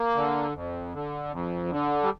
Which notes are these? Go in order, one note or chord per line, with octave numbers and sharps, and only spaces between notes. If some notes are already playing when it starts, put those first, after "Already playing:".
Already playing: A#3
D3
F2
D3
F2
D3
G3